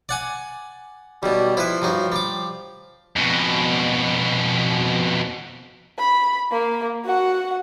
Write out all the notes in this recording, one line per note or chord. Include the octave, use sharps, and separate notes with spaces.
D5 F#5 G#5
B1 B2 G3
F3 E4 B4
G2 F#3 D#4
G3 D6
F2 B2
B5
A#3
F#4 F#5